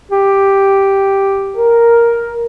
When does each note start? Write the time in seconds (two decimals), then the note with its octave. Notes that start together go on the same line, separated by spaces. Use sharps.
0.12 G4
1.57 A#4